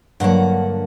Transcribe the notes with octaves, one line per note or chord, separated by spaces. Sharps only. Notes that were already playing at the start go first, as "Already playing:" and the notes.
G2 D3 F#3 A#3 F#5